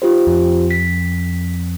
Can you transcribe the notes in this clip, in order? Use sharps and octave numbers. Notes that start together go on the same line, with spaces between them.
F4 G4 C5
F2
B6